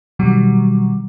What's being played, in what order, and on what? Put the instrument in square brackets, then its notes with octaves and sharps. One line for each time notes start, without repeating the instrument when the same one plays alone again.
[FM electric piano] B2 D#3 F#3 G3